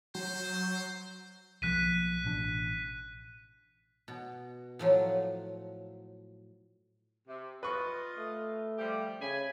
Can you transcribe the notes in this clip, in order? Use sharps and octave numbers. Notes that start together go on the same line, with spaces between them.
F#3 C5
B1 F3 A#3 F#6 B6 D#7
A1 B2 D4
B2
A2 F3 F#3
C3
F4 B4 D#5 C#6
A3
F3 G3 G4
C#3 G#5 B5